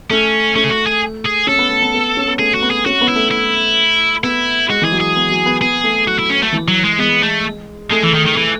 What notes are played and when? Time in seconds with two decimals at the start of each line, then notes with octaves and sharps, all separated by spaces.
0.10 A3 C#4
0.55 A3 C#4
0.64 G#4
0.71 F#4
0.87 G#4
1.25 G#4
1.47 C#4 A4
1.59 B3
1.70 A3
1.82 B3
1.94 B3
2.17 C#4
2.28 B3
2.39 A3 G#4
2.54 F#4
2.62 B3
2.70 G#4
2.86 C#4 F#4
3.01 B3
3.08 E4
3.15 A3
3.31 E4
4.23 B3 E4
4.69 G#3 F#4
4.82 E3 G#4
4.92 F#3
5.00 G#4
5.16 B3
5.31 F#3
5.46 B3
5.61 B3 G#4
5.84 A3
6.07 F#3 F#4
6.19 E4
6.30 C#4
6.42 A3
6.53 E3
6.68 F#3
6.83 G#3
6.99 G#3 B3
7.23 A3
7.90 G#3 A3
8.03 E3
8.14 D#3
8.26 D#3
8.36 E3 A3